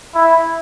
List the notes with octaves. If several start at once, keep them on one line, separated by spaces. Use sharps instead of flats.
E4